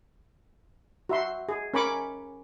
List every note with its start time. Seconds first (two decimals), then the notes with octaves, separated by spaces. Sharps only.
1.09 F#4 E5 C6
1.49 G#4
1.74 C#4 A#4 G#5 B5 C#6 D6